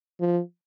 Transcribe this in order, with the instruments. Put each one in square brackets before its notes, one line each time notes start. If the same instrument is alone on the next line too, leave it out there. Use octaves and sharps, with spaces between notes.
[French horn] F3